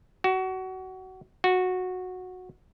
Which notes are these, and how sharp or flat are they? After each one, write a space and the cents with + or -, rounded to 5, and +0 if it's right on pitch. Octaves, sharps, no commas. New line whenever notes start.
F#4 +25
F#4 -10